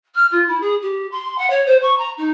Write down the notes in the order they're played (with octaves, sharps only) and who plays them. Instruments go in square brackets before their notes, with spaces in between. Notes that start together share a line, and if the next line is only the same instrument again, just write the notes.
[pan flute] F6
F4
E4
G#4
G4
C6
F#5
C#5
C5
C#6
A#5
D#4